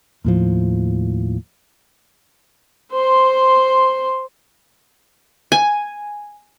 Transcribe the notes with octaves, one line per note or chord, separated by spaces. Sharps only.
D#2 A2 F3
C5 C6
G#5